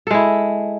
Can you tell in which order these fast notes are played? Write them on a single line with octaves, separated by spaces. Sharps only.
A4 G#3 E4